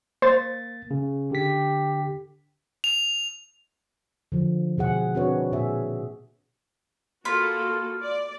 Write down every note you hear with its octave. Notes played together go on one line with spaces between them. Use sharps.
A#3 C5 A6
C#3
D3 G4 B6
F7
D3 F3
B2 G#4 F#5
C4 D4 F#4 B4 C#5
A#2 G#4 E5
A#3 F4 F#4 A4 B5
D5